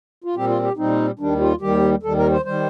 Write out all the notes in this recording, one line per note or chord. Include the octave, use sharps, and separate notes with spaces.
F4
A#2 G3 C4 G4
F4
G4
A#2 G3 C4 D#4
D#2 D#3 G3 D4
F4
D#2 D#3 G3 G4
D#2 D#3 G3 A4
A#4
C5
D#3 G3 C5